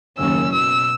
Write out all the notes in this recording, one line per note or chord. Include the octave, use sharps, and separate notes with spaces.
F#1 D#2 C#4 E6
B2 E6